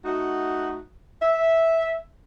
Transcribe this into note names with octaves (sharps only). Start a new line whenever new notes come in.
A3 D#4 F#4
E5